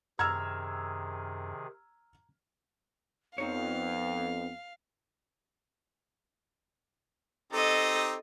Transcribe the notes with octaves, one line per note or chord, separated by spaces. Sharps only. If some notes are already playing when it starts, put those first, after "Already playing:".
F#2 C3 D#3 G#4 A#5 E6 F6 G#6
F2 B3 C4 D#4 C#5 F5
C4 D#4 G4 A4 D#5